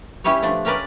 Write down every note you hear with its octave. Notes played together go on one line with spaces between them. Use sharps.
G3 C#4 E4 G4 B4 C#5
F3 A3 D4
C#4 G4 A#4 B4 D5